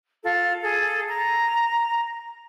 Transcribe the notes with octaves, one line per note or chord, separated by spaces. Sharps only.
F4 A4
G#4 A4
A#5